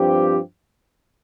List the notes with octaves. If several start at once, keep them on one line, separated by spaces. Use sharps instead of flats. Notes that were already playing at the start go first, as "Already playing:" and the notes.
Already playing: G2 F3 C4 G4